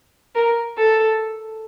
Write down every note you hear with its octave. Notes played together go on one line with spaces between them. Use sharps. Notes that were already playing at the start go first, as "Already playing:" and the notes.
A#4
A4